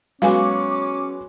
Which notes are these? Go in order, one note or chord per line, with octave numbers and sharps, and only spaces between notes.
F#3 G#3 B3 C#4 F5 G#5 D6